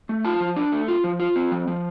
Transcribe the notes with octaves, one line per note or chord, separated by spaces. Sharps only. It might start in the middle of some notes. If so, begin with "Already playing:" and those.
A3
F4 A5
F3
D4
A3
F4
F3
F4
C4
F3
F3